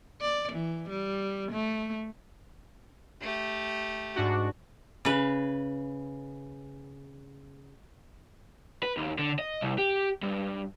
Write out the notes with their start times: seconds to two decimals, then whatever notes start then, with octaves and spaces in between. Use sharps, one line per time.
0.21 D5
0.52 E3
0.89 G3
1.52 A3
3.21 A3 G4
4.16 G#2 D4 F#4
5.05 C#3 B4
8.83 B4
8.97 D#2
9.19 D3
9.39 D#5
9.61 C2
9.78 G4
10.23 G2